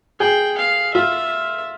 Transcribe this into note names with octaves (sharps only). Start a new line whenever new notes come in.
G#4 G5
F5
F4 E5